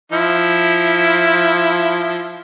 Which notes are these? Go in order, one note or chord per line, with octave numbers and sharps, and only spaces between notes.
F3 E4